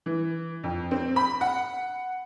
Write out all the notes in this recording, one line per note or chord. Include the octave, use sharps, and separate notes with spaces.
E3
F2
C4
B5
F#5